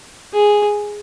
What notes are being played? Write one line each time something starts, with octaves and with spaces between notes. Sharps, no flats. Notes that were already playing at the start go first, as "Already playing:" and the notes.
G#4